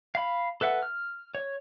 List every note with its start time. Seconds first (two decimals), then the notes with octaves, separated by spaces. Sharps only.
0.15 F5 B5
0.61 A4 B4 E5 F#5
0.83 F6
1.35 C#5